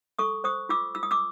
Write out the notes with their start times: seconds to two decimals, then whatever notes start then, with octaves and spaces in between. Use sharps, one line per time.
0.19 A4 C#6 D#6
0.44 C5 C#6 D#6
0.69 F4 D6 E6
0.95 F4 E6
1.03 D#6
1.11 D6 E6